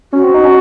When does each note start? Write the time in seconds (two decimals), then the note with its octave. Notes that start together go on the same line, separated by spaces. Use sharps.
0.13 C#4 F#4
0.24 C4
0.34 D#4
0.45 C#4